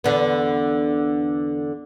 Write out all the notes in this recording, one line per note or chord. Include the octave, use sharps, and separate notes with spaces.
E2 D3 B3